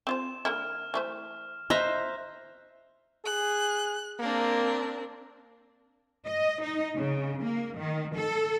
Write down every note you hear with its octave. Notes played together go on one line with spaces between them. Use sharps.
C4 F4 C5 E7
D3 A#3 E4 F6
E3 A3 C5
B4 C5 D#5 E5 A#5 F#6 G6
G#4 F#6
A#3 C4 D4 A#4
D#5
D#4
C#3
A#3
D#3
A4